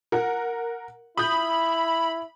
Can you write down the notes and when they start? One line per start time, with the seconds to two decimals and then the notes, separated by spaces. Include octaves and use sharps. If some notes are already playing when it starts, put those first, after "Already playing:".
0.12 A#4 F#5
1.17 E4 B5 D#6 G6